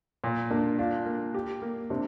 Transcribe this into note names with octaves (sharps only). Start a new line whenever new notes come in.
A#2
A#3 D4
D4 F4
A#3
G4
A#3
C3 D4